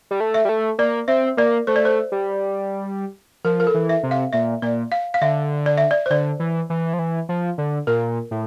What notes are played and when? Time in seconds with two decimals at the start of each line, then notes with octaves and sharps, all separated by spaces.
0.11 G3
0.20 A3
0.34 E5
0.45 G3
0.49 A3
0.79 A#3 D5
1.08 C4 E5
1.37 A#3 D5
1.67 A3 C5
1.76 D5
1.85 C5
2.12 G3
3.44 F3 A#4
3.60 A#4
3.67 A4
3.74 E3
3.89 E5
4.03 C3
4.11 F5
4.33 A#2 E5
4.62 A#2 D5
4.92 F5
5.14 F5
5.21 D3 E5
5.66 D5
5.78 E5
5.91 D5
6.06 C5
6.10 D3 D5
6.40 E3
6.70 E3
6.93 F3
6.99 E3
7.29 F3
7.58 D3
7.87 A#2 A#4
8.31 A2